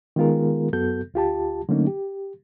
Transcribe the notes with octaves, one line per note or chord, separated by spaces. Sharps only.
D#3 G#3 B3 F4 G#4 A#4
F#2 B3 F#4 A4 G6
D2 F4 G4 A5
D3 F#3 A3 A#3 C#4 D#4
G4